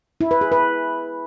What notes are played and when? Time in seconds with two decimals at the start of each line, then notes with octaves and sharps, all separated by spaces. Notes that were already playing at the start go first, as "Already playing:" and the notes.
0.21 E4
0.31 B4
0.41 G#4
0.52 B4